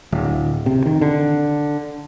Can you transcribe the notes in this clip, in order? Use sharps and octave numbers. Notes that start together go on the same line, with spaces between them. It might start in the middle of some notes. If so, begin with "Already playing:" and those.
D1
C3
D#3
D3